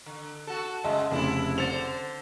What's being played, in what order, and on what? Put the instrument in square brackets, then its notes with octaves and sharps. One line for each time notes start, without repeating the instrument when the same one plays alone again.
[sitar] D3
F#4 A4
[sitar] C#3 G#3 [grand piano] D#5 E5 A5
[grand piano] F1 C#3 [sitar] D4 E4
[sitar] D3 C5 [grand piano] A6 C#7 F7